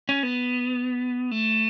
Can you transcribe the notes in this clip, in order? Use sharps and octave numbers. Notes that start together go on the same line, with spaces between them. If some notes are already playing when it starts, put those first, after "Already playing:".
C#4
B3
A3